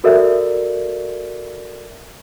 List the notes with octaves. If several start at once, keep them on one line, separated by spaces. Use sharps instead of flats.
F#4 A4 A#4 D5 E5